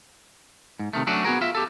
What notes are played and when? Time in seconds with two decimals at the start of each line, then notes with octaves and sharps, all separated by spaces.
0.79 G#2
0.93 C3 D#3 A3
1.07 F#3 A3 C#4 D4 F#4
1.24 B3 F#4 G#4 A#4
1.41 F4 E5
1.55 G4 A4